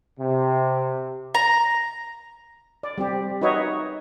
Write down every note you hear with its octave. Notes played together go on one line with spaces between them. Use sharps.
C3
A#5
D5
G3 C4 G4
D#4 F#4 B4 C#5 D#5 E5